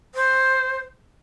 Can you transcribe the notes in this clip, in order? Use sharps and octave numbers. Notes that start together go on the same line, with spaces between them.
C5